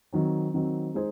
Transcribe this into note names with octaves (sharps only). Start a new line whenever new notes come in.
D#3 F#3 C4
D#3 F#3 C4
G#3 D#4 G#4 C5